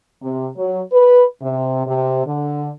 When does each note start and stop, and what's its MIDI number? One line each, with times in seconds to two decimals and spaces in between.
0.22 0.48 48
0.57 0.81 54
0.93 1.24 71
1.42 1.83 48
1.87 2.23 48
2.26 2.70 50